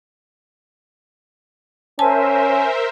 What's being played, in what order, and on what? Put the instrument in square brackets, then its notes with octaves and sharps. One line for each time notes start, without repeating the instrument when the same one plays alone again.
[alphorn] C#4 [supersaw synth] A#4 C5 E5 [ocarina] G#5 [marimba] A5